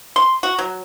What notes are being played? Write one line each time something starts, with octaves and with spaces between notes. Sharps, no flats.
C6
F#4
F#3